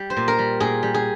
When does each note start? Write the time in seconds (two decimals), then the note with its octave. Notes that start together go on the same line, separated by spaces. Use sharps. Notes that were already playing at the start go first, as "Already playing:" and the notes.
Already playing: G3
0.10 C5
0.17 A#2
0.28 A#4
0.39 G3
0.60 A#2 G#4
0.83 G3
0.94 G#4